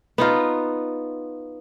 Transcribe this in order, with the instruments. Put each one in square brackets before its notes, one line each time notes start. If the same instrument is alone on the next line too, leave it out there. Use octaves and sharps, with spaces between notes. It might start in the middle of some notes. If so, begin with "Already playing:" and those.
[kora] B3 D#4 F4